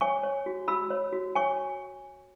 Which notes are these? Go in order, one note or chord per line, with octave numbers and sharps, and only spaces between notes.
C#5 G#5 C#6
C#5
F#4
F#4 B5 E6
C#5
F#4
C#5 G#5 C#6